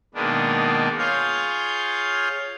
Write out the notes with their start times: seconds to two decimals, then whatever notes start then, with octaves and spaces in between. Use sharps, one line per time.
0.15 B2 D#3 G#3 A#3 B3 D4
0.98 F4 G#4 C#5 F5 G6